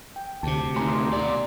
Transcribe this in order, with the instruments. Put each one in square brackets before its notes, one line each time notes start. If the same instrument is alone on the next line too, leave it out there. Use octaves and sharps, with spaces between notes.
[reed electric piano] G5
[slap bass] D2 C3 [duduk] G4 [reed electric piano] A5
[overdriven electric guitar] A2 D#3 [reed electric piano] G#5 A#5 C6
[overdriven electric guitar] B2 D5